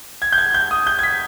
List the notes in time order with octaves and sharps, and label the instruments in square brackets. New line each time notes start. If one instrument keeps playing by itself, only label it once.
[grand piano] G#6
G6
G#6
G6
D#6
G6
G#6
B6